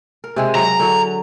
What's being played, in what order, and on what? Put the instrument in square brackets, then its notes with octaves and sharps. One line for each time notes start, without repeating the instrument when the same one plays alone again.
[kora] A#4
C3 G#3 G#4
[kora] F#3 [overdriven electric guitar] A#5
[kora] D3 F#3